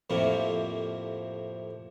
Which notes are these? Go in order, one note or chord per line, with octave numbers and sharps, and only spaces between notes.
F2 A2 C3 A#3